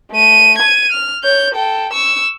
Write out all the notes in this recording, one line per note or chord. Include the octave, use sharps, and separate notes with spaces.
A3 D#7
G#6 D#7
F6
C#5 G6
A4 G5
C#6 E6